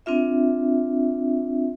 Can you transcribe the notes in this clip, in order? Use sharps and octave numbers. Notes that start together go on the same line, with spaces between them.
C4 D4 F4 E5